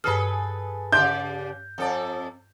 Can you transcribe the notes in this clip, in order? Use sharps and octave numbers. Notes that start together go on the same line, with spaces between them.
G2 G#4 A4 B4 F6
C#3 G4 D5 E5 A5 C6 G6
F2 A4 D5